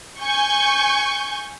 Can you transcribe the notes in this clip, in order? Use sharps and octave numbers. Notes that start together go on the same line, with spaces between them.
G#5 C#6 G6